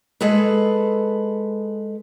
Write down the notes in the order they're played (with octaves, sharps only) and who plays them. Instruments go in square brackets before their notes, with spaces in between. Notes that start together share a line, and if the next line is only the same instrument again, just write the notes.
[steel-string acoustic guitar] G#3 G#4 A4 B4